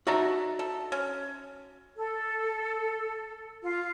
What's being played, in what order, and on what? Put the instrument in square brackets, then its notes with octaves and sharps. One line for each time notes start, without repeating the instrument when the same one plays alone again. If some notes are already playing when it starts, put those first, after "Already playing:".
[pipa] D4 D#4 E5 [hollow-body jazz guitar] F#4 A#5
[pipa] A4
C#4
[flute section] A4
F4